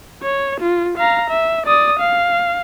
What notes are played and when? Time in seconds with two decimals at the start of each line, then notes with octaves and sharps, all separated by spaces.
0.23 C#5
0.61 F4
0.98 F5 A#5
1.30 E5
1.67 D5 D#6
2.00 F5